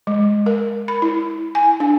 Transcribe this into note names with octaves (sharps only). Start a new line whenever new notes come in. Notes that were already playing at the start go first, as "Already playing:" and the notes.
G#3
A#4
B5
E4
G#5
D4